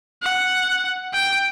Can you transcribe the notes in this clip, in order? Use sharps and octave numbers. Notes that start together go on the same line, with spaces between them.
F#5
G5